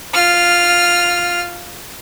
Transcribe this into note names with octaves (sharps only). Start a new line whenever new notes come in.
F4 F6